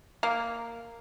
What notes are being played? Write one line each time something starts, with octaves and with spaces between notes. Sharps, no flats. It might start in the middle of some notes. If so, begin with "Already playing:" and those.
A#3